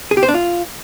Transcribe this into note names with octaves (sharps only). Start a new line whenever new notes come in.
G#4
G4
C5
D4
F4